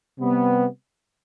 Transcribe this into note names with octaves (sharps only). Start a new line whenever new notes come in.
C3 G3 B3